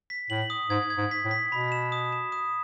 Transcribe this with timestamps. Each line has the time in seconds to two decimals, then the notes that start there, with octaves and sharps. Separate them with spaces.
0.10 B6
0.30 A2 F#7
0.50 D#6
0.70 G#2 G#6
0.90 G#6
0.97 G#2
1.11 B6
1.25 A2
1.31 B6
1.52 B2 B5
1.72 E7
1.92 D#6
2.12 E7
2.32 D#6